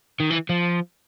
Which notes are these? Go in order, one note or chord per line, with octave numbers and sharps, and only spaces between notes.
D#3
E3
F3